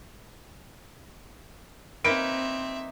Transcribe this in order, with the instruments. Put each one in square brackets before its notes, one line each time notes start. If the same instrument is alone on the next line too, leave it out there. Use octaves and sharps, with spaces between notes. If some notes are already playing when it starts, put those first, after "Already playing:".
[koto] A#3 D#4 B4 [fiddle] C4 E5 [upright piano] D7